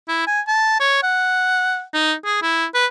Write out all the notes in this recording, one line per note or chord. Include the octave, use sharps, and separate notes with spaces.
E4
G#5
A5
C#5
F#5
D#4
G#4
E4
B4